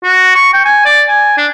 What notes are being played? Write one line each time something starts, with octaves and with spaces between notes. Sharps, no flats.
F#4
C#6
G5
G#5
D5
G#5
D4